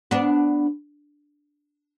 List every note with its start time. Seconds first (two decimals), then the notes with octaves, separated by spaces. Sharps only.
0.11 B3 D4